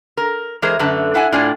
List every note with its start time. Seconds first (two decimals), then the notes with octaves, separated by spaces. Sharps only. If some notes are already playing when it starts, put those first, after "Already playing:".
0.17 A#4
0.62 E3 G#3 G#4 A#4 C5
0.79 F#2 D3 A3 B4 A5
1.14 D4 E4 F#5 G#5
1.32 A2 D4 F4 D5 G#5